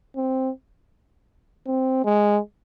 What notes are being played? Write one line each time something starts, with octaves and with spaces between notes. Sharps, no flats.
C4
C4
G#3